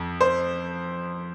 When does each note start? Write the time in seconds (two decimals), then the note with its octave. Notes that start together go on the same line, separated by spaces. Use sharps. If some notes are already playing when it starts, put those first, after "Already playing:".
Already playing: F2
0.21 C5